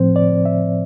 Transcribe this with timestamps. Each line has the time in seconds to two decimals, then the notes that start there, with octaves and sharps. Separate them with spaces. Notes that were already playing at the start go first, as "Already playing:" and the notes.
Already playing: A2 F3 C4 C5
0.16 D5
0.45 E5